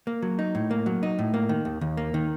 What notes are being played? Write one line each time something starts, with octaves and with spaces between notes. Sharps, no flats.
A#3
F#3
D#4
A2
A#3
F#3
D#4
A2
A#3
D#3
D#2
D#2
A#3
D#3